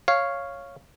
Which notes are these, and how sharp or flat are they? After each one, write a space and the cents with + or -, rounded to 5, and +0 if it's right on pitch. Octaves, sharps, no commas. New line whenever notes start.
C#5 +0 F5 -5